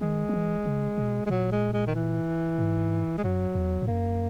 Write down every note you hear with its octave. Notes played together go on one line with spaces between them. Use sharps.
D#3 G#3
F#3
E3
C#3
B2
G#3
A#2 F#3
G#3
G#3
D#3
E3
G#2
G#3
F#2 F#3
E2
G#2
F#2 A#3